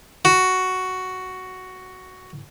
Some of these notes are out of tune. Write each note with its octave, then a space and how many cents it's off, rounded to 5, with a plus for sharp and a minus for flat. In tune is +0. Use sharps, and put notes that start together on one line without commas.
F#4 +5